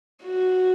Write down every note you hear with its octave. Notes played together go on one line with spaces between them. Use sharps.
F#4